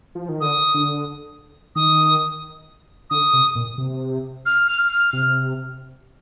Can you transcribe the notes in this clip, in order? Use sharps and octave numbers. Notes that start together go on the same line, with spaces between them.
F3
D#3
D3 D#6
D3
D#3 D#6
D3 D#6
C3
A#2
C3
F6
F6
F6
C3 F6